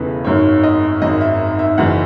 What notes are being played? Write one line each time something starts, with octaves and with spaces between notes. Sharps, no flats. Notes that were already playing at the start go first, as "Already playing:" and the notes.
Already playing: E1 E2 C#3 E3 A4 B4
G#1 F#2 D#3 C#5
D#5
G#1 F#2 D#3 D#5
E5
E5
F#1 F#2 E3 F#5